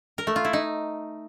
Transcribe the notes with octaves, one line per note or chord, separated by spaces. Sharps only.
A#4
A3
F4
E4
D#4